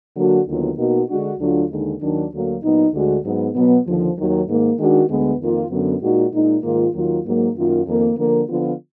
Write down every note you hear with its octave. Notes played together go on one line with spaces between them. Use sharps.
D3 F#3 A#3 D4 F#4
D#2 D3 F#3 B3 F4
B2 A#3 D#4 F#4
D3 G#3 D4 F#4
D2 D3 F#3 D4 F4
D#2 D3 G#3 D#4
D#2 D#3 F#3 D4
D2 D3 F#3 A#3
A#2 F#3 B3 D#4
D2 D3 G#3 D4 F#4
G#2 F#3 B3
B2 F#3 B3
D#2 D3 F3
D#2 D#3 F#3
G#2 D#3 A#3
D#3 G#3 D4 F#4
D2 D3 G#3 B3
F2 D#3 A#3 F4
F#2 D3 F#3 B3
A#2 G#3 D#4 F#4
A#2 G#3 D#4
G#2 D#3 A#3 F4
D#2 D#3 F#3 A#3 F4
G#2 F#3 A#3
F#2 D#3 A#3 F4
F2 D#3 A#3
D3 F3 A#3
D3 F3 B3 F4